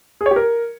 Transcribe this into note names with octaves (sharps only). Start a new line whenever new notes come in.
G#4
C#5
G4
A#4